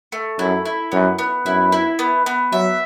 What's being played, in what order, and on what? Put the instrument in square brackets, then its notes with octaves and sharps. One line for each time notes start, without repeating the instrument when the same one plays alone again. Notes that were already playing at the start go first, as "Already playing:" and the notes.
[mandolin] A3
[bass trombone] F#2 [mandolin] E4
[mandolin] E4
[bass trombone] F#2 [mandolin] B3
[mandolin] B3
[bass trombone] F#2 [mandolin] E4
[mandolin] E4
B3
B3
[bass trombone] F#3 [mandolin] E5